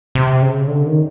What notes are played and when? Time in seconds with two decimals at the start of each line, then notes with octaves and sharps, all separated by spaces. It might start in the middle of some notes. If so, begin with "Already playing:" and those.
0.15 C3
0.42 C#3
0.68 D3
0.86 D#3